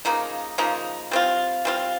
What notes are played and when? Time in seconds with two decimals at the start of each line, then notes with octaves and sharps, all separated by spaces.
0.05 C#3 F3 A#3 D#4
0.58 C#3 F3 A#3 D#4
1.11 G3 C4 F4
1.65 G3 C4 F4